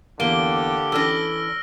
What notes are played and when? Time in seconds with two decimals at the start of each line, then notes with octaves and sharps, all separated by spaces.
0.20 E2 D3 A#3 G4 D7 G7
0.92 E3 C#4 D4 A4 E6 F6 A#6